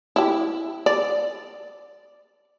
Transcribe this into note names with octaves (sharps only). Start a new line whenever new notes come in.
E4 G4
D5